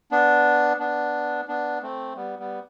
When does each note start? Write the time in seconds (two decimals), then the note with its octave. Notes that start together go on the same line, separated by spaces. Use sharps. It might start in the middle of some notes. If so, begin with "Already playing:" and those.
0.12 B3 D4
0.80 B3 D4
1.48 B3 D4
1.82 A3 C4
2.16 G3 B3
2.39 G3 B3